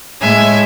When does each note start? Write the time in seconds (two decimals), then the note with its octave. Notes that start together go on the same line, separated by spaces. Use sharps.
0.20 A2 G#3 E5 G#5